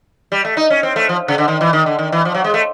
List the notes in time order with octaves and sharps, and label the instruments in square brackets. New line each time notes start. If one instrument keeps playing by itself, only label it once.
[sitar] G3
A3
D#4
C#4
C4
A3
F3
C#3
D3
D#3
E3
D#3
D3
D#3
E3
F3
F#3
G#3
A3